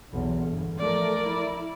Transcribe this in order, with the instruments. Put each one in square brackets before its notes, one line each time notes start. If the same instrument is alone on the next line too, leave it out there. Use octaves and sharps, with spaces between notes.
[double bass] B1 E2
G1
[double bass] F3 A3 [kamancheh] A#4 D5
[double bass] E4